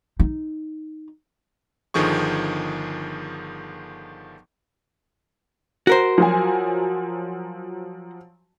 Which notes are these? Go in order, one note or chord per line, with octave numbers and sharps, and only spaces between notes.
D#4
G1 D3 D#3 F3 G#4 C#6
F#4 A#4 C5
F3 F#3 G#5